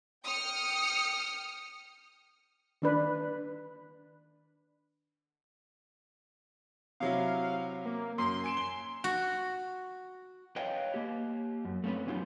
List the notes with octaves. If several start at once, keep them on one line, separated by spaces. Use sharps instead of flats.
G5 D#6 F6 C#7
D#3 D4 B4
C3 F#3 E4 F5
A#3
F#2 C6
G#5 D7 E7
G7
F#4
B4 C#5 D#5 F5 G5
A#3 G4
F#2
A3 C4 C#4 B4
F#3 B3 C#4 D#4 F4 G4